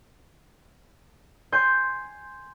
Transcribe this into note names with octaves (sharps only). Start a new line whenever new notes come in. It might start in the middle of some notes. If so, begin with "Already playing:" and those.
G#5 C6 G6